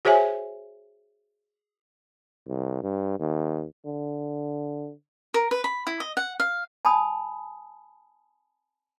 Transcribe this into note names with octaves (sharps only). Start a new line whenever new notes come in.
F#4 G#4 C5 C#5 E5 G#5
C2
G2
D#2
D3
A#4
B4
B5
E4
D#5
F#5
F5
G#5 A5 B5 D#6